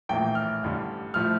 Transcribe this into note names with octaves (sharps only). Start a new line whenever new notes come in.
A#1 A2 E3 A#3 G5
F6
A1 G2 D3
A2 F3 A3 F6